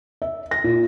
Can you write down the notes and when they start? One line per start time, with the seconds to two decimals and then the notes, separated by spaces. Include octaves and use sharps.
0.22 E5
0.51 A#6
0.64 A#2